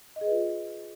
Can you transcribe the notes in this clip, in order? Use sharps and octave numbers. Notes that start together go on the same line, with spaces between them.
D#5
G#4
B4
F4